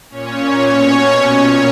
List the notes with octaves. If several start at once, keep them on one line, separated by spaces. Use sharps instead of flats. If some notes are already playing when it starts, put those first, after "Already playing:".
A#2 C#4 C#5
C#4 C#5
B2
C#4 C#5
A#2 C#4 C#5